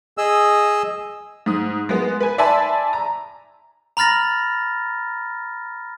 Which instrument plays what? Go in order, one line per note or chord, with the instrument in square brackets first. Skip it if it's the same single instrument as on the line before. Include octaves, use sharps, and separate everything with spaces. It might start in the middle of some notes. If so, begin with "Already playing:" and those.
[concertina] G#4 D#5 E6
[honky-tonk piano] G#2 D#6
G#3 B3
B4 G#5
D5 E5 G#5 A5 B5 C6
A#5
[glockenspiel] A#5 B5 F6 A6 A#6